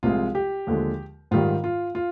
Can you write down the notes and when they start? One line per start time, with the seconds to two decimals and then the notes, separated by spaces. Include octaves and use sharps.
0.03 C2 C3 F3 G#3 F4
0.35 G4
0.67 D#2 D3 F3 G#3
1.31 G#2 D#3 G3 F4
1.64 F4
1.95 F4